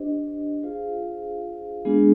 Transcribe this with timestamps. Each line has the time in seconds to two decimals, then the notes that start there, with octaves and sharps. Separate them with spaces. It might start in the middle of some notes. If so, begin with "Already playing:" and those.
Already playing: D4 G4 C5 D#5
0.63 F4 G#4 C5 F5
1.85 G#3 B3 D4 F4 G#4